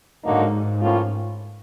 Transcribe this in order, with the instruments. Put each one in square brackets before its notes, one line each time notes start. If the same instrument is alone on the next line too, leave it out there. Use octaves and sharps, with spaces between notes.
[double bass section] G#2 [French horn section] D3 F#3 A#3 D#4 F#4
[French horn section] A2 F3 A#3 C#4 F4